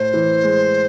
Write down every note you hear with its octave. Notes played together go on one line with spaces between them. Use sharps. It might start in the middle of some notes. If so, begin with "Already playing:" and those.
Already playing: A2 C5
E3
G#3